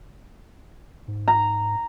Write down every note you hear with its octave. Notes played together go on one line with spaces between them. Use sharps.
G#2
A#5